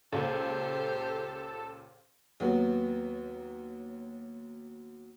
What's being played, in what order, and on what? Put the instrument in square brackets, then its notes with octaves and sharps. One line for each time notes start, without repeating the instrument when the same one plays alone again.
[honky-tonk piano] C#2 A#2 [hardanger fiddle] G4 C5 [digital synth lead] A4
[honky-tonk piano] D#2 F#3 B3